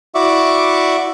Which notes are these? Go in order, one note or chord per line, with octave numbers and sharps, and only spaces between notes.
E4 F#4 D5 E5 C#6 D6